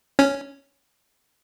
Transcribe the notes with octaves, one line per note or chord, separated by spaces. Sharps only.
C#4